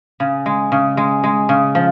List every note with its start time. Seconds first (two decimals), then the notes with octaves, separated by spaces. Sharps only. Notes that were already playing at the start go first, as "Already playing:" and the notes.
0.20 C#3
0.46 G#3
0.72 C#3
0.97 G#3
1.24 G#3
1.49 C#3
1.75 F3